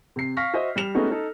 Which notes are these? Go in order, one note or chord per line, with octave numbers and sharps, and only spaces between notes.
C3 C7
F5 C#6 F6 A#6 B6
F#4 C5 D#5 E5
G3 E7 F7
G#3 A3 B3 C#4 D#4 F#4
D#4 A4